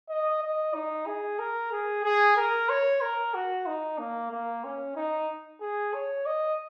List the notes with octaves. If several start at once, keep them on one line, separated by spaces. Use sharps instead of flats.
D#5
D#5
D#4
G#4
A#4
G#4
G#4
A#4
C#5
A#4
F#4
D#4
A#3
A#3
C#4
D#4
G#4
C#5
D#5